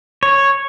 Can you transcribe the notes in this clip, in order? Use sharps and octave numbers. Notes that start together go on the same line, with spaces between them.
C#5